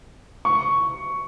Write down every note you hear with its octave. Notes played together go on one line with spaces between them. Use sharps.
C#6